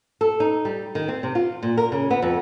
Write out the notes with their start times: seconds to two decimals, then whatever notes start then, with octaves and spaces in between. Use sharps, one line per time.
0.21 A4
0.40 D#4
0.65 G3
0.95 D#3
1.08 C4
1.23 C3
1.35 F4
1.63 A#2
1.77 A#4
1.92 C#3
2.10 B3
2.22 F2